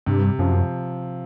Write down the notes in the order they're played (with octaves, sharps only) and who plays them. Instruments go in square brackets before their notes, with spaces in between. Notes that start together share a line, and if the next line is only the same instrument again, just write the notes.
[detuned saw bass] G2 [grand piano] C3
[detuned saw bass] F#2 [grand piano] F3